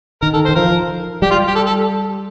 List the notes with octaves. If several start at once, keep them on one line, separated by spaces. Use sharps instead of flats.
D#3 A#4
A4
C5
D#3
F3 A#4
G3 G4
F4
G4
A4
A4